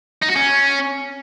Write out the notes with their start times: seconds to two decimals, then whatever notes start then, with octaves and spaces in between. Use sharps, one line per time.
0.22 D#4
0.29 F#4
0.36 C#4